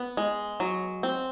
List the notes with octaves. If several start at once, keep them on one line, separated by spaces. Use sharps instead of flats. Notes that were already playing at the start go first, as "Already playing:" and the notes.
Already playing: B3
G#3
F#3
C4